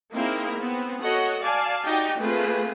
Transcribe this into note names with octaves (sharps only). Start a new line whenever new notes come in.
A#3 C4 D#4 E4 G#4 A#4
B3 C4
F#4 A4 C#5 D#5 F#5
D5 F5 G#5 A5
D#4 F#4 G4 D5 G5
A3 A#3 C4 F4 G#4 B4